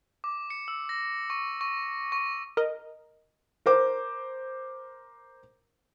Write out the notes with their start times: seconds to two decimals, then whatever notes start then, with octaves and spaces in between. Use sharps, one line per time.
0.24 D6
0.50 C#7
0.68 E6
0.89 A#6
1.30 C#6
1.61 C#6
2.12 C#6
2.57 A#4 D#5
3.66 A#4 C5 D6